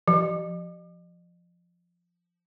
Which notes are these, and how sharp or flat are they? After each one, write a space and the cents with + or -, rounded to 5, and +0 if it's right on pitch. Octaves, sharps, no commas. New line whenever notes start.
F3 +0